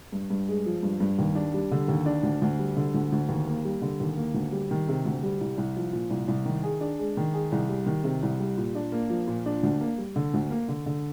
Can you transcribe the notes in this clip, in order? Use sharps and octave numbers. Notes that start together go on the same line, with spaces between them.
G2
G2
G#3
F3
G2
G2
D#2
D4
G3
D3
D#2
D4
D2
D2
G3
D3
D2
D2
D#2
A#3
G3
D3
D#2
A#3
D2
G3
D#3
C3
D2
G3
C2
C2
F3
A#2
C2
C2
D#3
G#4
D4
G#3
D#3
G#4
C2
G3
D#3
C3
C2
G3
A#2
D4
A#3
F3
A#2
D4
D2
A#3
G3
D3
D2
A#3
D3
D3